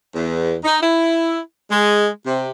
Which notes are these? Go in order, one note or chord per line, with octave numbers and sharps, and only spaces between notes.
E2
D#4
E4
G#3
C3